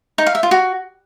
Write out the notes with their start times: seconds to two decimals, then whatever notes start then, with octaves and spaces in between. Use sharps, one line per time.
0.18 D#4
0.27 F5
0.35 E5
0.43 F4
0.51 F#4